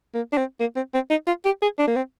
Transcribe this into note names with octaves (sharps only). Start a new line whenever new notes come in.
A#3
D4
C4
A#3
C4
C4
D#4
F4
G4
G#4
D4
A#3
C4